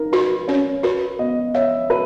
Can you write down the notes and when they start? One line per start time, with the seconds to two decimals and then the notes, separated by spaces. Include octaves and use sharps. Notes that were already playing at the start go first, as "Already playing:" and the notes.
Already playing: D#4 A#4
0.13 F#4 B4
0.48 C#4 C#5
0.83 F#4 B4
1.19 B3 D#5
1.54 C#5 E5
1.90 F#4 B4